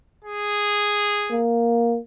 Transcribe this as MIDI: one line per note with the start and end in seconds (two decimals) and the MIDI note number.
0.25 1.43 68
1.31 1.97 58